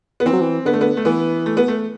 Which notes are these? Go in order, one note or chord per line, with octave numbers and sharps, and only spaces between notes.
B3
E3 C4
F#3
E3
D3 B3
A3
B3
A3
E3 B3
A3
B3
A3